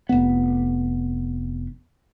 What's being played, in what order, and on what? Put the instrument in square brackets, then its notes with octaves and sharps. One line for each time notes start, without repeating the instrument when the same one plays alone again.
[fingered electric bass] F1 B3